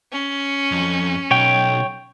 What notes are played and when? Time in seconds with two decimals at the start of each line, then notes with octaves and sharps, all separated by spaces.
0.12 C#4
0.72 F2
1.31 B1 C#5 G5